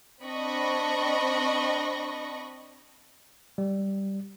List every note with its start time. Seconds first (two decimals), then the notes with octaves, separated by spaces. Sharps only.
0.22 C4 D4 D#5 B5 C#6 A#6
3.58 G3